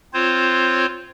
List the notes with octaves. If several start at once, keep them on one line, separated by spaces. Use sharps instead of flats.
C4 F4 C5 C#5